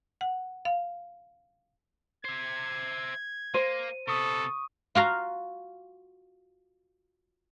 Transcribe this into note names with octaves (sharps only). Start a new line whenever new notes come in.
F#5
F5
C5 E5 G#6
A#3 C5 D#7
C3 B3 A4 C#6 D#6
F4 F#4 F5 A#5